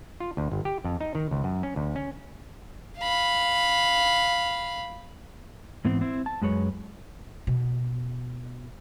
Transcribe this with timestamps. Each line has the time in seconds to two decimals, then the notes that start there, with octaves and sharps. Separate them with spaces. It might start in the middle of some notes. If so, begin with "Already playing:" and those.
0.20 F4
0.37 D2
0.52 G1
0.65 G4
0.84 F2
1.01 D#4
1.15 D#3
1.31 C#2
1.44 F#2
1.63 C#4
1.76 D2
1.96 C#4
2.99 F5 B5
5.85 G#2 E3 B3 C4
6.01 C4 E4
6.26 A5
6.42 F#2 G#3 B4 C#5
7.47 B2